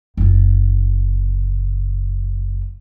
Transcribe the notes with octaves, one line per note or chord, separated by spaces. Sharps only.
F#1 F4